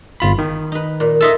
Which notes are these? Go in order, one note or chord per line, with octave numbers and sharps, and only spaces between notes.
G1 F4 B5
D#3
D#4 B4
A#2
D#4 F4 A4 D#5 E5 E6